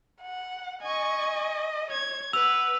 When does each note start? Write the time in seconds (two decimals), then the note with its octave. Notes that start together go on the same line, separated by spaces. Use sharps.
0.22 F#5
0.82 D#5 G#5 C#6
1.91 C#5 G#6
2.33 B4 F#5 E6 F7